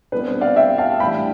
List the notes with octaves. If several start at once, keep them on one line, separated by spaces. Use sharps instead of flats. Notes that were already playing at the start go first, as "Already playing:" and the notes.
C2 B2 B3 D4 B4
C5
D5 F5
E5 G5
F5 A5
A2 E3 G3 D4 G5 B5